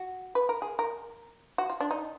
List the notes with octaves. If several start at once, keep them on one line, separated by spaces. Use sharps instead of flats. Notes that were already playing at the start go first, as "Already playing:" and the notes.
Already playing: F#4
B4
A#4
G#4
A#4
F#4
F4
D4
D#4